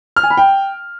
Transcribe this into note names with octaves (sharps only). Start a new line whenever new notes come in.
F6
G#5
B5
G5